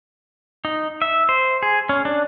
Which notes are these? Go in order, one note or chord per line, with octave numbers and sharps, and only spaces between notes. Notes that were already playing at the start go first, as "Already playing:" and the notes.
D#4
E5
C5
G#4
C#4
D4